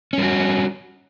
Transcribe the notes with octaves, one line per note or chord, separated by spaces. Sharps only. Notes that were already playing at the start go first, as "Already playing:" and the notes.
G3 C#4 F#4